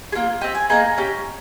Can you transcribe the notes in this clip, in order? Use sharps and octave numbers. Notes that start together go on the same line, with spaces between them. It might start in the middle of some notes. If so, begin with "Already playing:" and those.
G#4
A#3 F4
C4 G4 D#5
G#5
A#3 D#4 G#4 A#5
C#4 G4